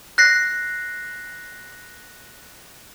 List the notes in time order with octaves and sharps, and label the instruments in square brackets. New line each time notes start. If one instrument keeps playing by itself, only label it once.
[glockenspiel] F#6 A#6 C7